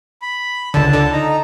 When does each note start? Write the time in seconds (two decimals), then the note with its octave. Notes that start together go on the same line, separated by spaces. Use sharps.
0.22 B5
0.74 C#2 D3 A5
0.93 D3
1.13 D#4 A#5